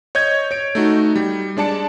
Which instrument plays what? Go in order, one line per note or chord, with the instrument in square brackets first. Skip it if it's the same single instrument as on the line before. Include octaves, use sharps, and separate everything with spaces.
[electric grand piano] C#5 D#5 G6 G#6
C#5 D7
A3 D#4 F#4
G3
G#3 D4 D5 A5 C#7